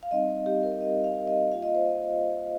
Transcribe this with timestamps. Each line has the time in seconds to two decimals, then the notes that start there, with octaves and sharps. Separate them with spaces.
0.03 F5
0.11 G3 C4 D#4 D#5
0.46 G4
0.63 A#4
0.81 D#5
1.04 F5
1.27 D#5
1.51 A#3 F4 F5
1.62 D#5
1.75 C5
1.85 D#5